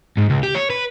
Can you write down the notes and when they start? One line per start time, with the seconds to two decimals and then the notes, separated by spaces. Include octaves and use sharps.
0.17 G#2
0.30 C#2
0.43 G4
0.55 C#5
0.70 B4